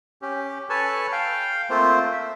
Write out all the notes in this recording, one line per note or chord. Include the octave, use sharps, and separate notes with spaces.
C#4 G4
A4 B4 C#5 G#5 A5
F5 G5
A3 A#3 C4 F4 C5
E5